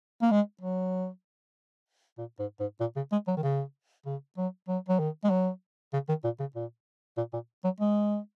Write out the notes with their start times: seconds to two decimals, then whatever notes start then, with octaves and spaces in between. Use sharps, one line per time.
0.22 A#3
0.31 G#3
0.61 F#3
2.18 A#2
2.39 G#2
2.60 G#2
2.80 A#2
2.96 C#3
3.12 G#3
3.28 F#3
3.37 D#3
3.43 C#3
4.06 C#3
4.37 F#3
4.68 F#3
4.88 F#3
4.99 D#3
5.24 G#3
5.30 F#3
5.93 C#3
6.09 D#3
6.24 A#2
6.40 C#3
6.55 A#2
7.17 A#2
7.33 A#2
7.64 F#3
7.80 G#3